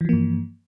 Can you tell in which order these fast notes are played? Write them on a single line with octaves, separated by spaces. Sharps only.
E3 F3 A#3 G2